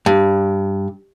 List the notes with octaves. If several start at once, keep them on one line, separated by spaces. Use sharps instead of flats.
G2